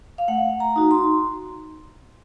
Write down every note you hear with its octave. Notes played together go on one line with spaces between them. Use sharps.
F5
A3 F#5
A#5
D#4 F#4
C6